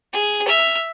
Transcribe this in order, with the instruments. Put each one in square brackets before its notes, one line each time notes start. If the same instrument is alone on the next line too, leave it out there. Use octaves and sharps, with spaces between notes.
[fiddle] G#4
E5 F6